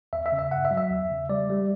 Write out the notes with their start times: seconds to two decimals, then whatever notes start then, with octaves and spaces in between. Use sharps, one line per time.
0.13 E2 E5
0.26 E5
0.32 C#3
0.39 E5
0.51 G2 F#5
0.65 E5
0.71 F#3
0.77 E5
0.90 E2
1.10 C#3
1.29 G3 D5
1.50 G3